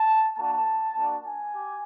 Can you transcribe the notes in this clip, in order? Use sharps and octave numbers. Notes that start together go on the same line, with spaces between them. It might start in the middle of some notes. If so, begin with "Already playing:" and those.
Already playing: A5
A#3 D4 F#4 A5
A#3 D4 F#4
G#5
G4